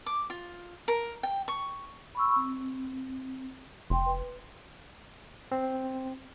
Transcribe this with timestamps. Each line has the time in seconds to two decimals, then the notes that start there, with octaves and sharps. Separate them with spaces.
0.06 D6
0.30 F4
0.88 A#4
1.23 G5
1.48 C#6
2.15 B5 C#6 E6
2.36 C4
3.90 F1 G5 C6
4.06 B4
5.52 C4